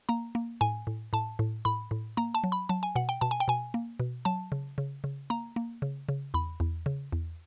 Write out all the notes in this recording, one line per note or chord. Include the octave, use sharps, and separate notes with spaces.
A#3 A#5
A#3
A2 G#5
A2
A2 A5
A2
A2 B5
A2
A#3 A#5
A5
F#3
B5
F#3 A5
G#5
B2 F#5
G5
B2 A5
G#5
G5
B2 G#5
A#3
B2
F#3 A5
C#3
C#3
C#3
A#3 A#5
A#3
C#3
C#3
E2 B5
E2
C#3
E2